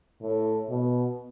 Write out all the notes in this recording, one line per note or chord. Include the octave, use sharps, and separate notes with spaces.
A2
B2